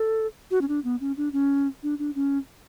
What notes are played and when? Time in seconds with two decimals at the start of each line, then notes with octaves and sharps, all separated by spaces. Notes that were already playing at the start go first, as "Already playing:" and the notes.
Already playing: A4
0.51 F#4
0.61 C#4
0.68 D4
0.84 B3
1.00 C#4
1.17 D4
1.33 C#4
1.83 D4
1.99 D4
2.15 C#4